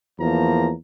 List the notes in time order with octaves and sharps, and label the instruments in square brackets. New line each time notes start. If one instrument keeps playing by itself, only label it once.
[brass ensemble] E2 F3 A#3 A#5